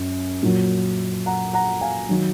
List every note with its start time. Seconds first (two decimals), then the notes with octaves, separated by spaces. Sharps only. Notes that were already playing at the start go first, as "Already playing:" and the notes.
Already playing: F#2
0.43 A#2 F#3
1.26 F#5 A#5
1.53 F#5 A#5
1.81 F5 G#5
2.09 D#3 F#3